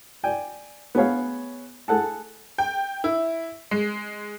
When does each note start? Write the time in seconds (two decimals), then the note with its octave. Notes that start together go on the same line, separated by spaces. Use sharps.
0.23 D5 G5 G#5
0.95 B3 G#4 C#5 F5
1.88 G#4 A4 F#5 A5
2.58 G5
3.04 E4
3.71 G#3